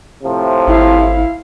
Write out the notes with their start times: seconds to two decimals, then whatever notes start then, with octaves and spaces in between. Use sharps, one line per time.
0.23 A2 C3 F3
0.67 G#1 E4 F5